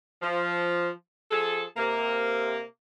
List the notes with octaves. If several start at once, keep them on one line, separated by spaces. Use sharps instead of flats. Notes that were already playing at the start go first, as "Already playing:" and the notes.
F3
F3 G#4 A4
C3 A#3